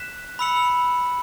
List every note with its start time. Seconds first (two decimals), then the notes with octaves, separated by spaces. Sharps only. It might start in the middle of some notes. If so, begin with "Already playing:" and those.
Already playing: F#6 B6 E7
0.39 B5 E6 C#7 F#7